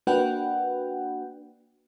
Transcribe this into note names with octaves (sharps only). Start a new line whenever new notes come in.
A#3 D4 F#4 B4 F#5 G5